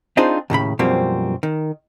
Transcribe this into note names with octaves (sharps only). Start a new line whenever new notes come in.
C4 D4 D#4 F4 G#4 C5
D#2 A2 C#3 B5
F#2 B2 F3 G3 A#3 C4
D#3